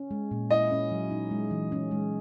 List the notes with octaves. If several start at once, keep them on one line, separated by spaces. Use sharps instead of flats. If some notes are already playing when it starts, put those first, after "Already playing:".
Already playing: C#4
G#3
A#2
E4 D#5
C#4
F#3
D#4
G#3
E3
C#4
G#3